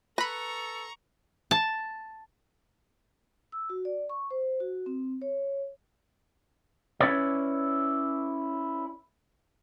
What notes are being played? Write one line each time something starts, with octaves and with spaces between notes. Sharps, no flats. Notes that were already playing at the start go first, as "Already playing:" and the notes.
A4 B4 A#5 B5 C#6 A#6
A5
E6
F#4
D5
C#6
C5
F#4
C4
C#5
C#4 E4 B4 C#5 D5